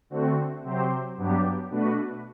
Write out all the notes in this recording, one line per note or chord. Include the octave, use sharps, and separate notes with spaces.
D3 A3 C4 F#4
C3 F#3 C4 G4 C5
G2 F#3 B3 D4 G4
B2 A3 D4 F#4 B4